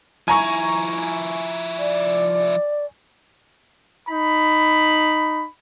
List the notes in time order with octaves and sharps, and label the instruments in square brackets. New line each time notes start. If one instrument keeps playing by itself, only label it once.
[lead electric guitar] F3 E4 [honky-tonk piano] G#5 A#5 C#6
[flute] D5
[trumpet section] D#4 B5